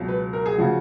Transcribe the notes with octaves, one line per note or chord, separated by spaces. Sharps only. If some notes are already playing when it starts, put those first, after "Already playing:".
Already playing: C#2 B2 F#3
B4
A#4
G#4
C#3 F3 F#4